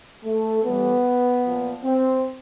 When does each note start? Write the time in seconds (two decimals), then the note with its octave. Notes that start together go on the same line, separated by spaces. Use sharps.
0.24 A3
0.64 A2 E3 G3 B3
1.44 A#2 F3
1.84 C4